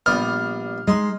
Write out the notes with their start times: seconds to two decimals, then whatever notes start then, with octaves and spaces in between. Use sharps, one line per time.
0.06 A#1 G3 B3 F6
0.87 G#3 D#4 C6